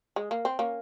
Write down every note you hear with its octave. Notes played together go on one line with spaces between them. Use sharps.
G#3
A#3
C4
A#3 C#4